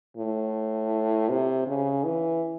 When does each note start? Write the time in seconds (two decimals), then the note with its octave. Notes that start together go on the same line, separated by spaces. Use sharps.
0.17 A2
1.29 C3
1.67 C#3
2.04 E3